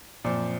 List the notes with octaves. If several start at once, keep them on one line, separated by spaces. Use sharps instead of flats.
F#2 A#2 F3 C4